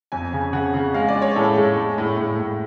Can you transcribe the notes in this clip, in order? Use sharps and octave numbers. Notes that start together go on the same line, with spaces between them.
F2 G#5
C#3
C#3 F#5
C#3
G#3 F5
D5
G#3
C#5
A2 A4
G#3
G#3
A2
A2
A2